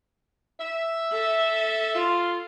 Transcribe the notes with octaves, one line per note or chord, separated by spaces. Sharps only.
E5
A4
F4